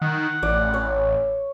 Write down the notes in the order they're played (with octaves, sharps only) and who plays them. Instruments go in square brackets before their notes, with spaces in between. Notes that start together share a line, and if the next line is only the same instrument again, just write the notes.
[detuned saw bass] D#3 [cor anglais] F#5
[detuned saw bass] A1 [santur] D5
[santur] C#5